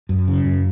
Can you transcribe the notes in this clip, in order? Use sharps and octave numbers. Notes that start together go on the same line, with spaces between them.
F#2
C#3
F#2